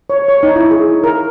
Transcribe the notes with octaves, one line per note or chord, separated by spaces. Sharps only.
C#5
C#5
D#4
E4
G#4
A#4